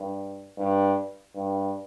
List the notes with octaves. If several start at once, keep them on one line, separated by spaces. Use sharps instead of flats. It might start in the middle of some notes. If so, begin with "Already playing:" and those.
Already playing: G2
G2
G2